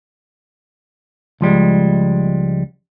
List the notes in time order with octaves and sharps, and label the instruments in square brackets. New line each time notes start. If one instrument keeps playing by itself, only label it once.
[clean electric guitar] C#2 F3 G3 G#3